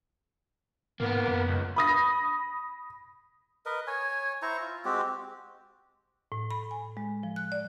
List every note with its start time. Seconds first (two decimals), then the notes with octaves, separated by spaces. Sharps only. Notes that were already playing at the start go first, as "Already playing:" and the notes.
1.00 G#2 A#3 B3
1.28 F#2
1.48 C#2
1.76 B5 D#6 A#6
3.66 A#4 B4 D#5
3.87 C#5 G#5
4.42 E4 C5 A#5 C#6
4.61 F4
4.85 G#3 C4 F#4 G4
6.32 A2
6.51 B5
6.71 G#5
6.97 G#3
7.23 F3
7.36 F#6
7.52 D5